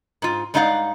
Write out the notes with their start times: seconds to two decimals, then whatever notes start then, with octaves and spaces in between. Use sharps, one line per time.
0.22 G#2 F4
0.54 G2 G#3 D#4 D5 F5 F#5